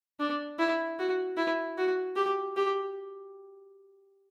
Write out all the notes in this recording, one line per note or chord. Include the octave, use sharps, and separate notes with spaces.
D4
E4
F#4
E4
F#4
G4
G4